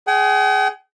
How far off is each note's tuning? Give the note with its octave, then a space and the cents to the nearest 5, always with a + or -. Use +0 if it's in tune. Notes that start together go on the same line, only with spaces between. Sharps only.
G#4 +10 G5 -45